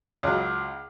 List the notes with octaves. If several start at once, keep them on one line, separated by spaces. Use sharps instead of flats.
C#2 F#3